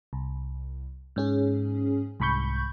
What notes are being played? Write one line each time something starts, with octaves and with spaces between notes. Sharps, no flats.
C2
G#2 C#4 G#4
C2 G#2 B5 C#6 G6